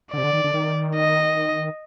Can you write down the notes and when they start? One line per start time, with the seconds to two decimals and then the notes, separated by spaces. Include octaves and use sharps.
0.13 D3 D5
0.18 C3
0.24 D3
0.33 D#3
0.44 D3
0.54 D#3
0.95 D#5